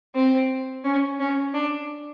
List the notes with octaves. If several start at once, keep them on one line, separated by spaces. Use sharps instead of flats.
C4
C#4
C#4
D4